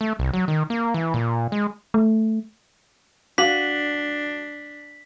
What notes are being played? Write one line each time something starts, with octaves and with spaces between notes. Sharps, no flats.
A3
C2
F#3
D#3
A#3
E3
A#2
G#3
A3
D4 F#4 F5 D6 B6 F#7